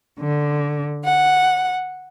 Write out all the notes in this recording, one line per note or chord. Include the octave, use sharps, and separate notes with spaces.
D3
F#5